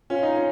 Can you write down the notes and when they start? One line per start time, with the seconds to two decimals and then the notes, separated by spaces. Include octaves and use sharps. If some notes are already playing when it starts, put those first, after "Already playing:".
0.10 C#4 F4
0.23 D#4
0.36 C#4